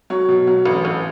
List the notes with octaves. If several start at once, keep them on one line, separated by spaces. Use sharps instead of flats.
F#3 C#5
B2
F#3
A1
A1